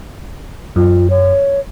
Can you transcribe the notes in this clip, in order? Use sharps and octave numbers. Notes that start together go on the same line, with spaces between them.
F#2 F4
C#5